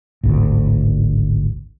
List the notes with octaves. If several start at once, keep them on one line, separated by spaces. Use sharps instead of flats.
D1 G#1 D2